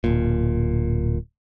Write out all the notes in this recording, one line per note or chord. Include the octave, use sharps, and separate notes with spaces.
D1 A#2